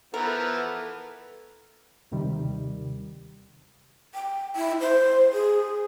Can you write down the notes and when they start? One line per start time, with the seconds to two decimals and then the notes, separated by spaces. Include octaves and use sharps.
0.14 E3 F3 B3 E4 A4 A#4
2.12 D#2 C3 D#3 G3
4.15 G5
4.56 E4
4.80 C5
5.33 G#4